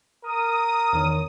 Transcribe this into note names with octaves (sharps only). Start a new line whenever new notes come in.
A#4 D#6
E2 D#3 C#5